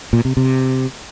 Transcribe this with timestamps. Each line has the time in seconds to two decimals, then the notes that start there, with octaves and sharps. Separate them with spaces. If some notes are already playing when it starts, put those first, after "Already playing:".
0.13 A#2
0.25 C3
0.37 C3